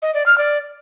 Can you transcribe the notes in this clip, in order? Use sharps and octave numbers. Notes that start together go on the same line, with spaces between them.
D#5
D5
F6
D5